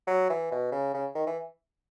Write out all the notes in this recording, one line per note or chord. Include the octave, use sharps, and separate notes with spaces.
F#3
E3
B2
C#3
C#3
D#3
E3